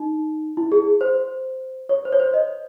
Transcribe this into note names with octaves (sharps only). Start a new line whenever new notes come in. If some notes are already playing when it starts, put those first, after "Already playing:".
Already playing: D#4
E4
G#4
C5
C#5
C5
C#5
C5
D#5